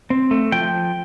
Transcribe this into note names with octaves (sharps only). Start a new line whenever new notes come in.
C4
A3
F3 G5